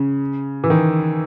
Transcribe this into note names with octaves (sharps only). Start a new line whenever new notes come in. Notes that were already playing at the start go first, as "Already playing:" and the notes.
Already playing: C#3
E3
D#3